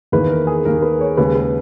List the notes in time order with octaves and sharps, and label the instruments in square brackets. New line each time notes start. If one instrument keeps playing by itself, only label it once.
[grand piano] E2 D#3 A#3 E4 [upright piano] B4
[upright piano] A#4
G#4
[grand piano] D#2 D#3 A#3 [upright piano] A#4
[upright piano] B4
C#5
[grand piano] D#2 C#3 G#3 [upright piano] B4
[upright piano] B4